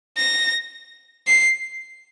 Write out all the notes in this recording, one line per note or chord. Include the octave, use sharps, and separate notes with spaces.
A#6
C7